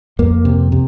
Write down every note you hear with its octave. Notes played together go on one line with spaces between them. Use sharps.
F2 A#3
C3
C3